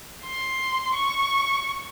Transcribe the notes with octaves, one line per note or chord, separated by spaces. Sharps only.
C6
C#6